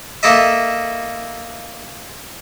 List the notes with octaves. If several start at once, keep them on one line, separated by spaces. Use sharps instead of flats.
A#3 A4 D#5 E5